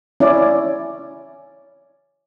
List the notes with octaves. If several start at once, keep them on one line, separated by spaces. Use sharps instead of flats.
C#4 E4 D5